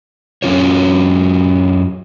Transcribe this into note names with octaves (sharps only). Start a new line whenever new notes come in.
F#2 F#3 C#4 F4 C#5